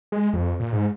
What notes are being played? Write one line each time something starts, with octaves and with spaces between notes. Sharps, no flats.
G#3
F2
A#2
G#2